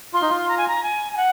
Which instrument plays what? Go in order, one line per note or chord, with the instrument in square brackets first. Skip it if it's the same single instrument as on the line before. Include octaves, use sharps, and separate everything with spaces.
[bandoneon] F4 [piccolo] C6
[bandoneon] D#4
F4
[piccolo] A#5
G#5
A#5
G#5
G#5
F#5